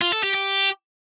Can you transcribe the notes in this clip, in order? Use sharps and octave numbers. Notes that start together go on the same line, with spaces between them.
F4
A4
G4
G4